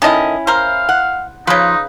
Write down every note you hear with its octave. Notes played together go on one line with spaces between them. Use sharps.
D#3 C#4 E4 A4 D#5
A#4 C5 F5
F#5
C#3 F3 D#4 B4